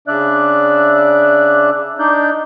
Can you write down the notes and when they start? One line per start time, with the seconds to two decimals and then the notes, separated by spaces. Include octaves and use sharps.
0.08 C#3 D4 D5 E5 F#6
1.99 D4 D#4 D5 G6